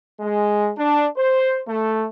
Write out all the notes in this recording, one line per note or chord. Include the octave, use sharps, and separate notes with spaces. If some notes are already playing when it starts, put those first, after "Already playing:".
G#3
D4
C5
A3